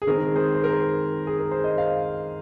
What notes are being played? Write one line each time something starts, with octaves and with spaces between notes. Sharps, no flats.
G#4
D#3 G#3 C4 A#4
G#4 C5
C5
A#4
G#4
A#4
C5
D#5
C5 F5